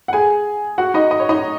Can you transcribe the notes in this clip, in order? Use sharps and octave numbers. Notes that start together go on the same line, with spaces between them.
F#5
G#4 G#5
F#4 F#5
D#4 D#5
D#5
C#5
D#4 D#5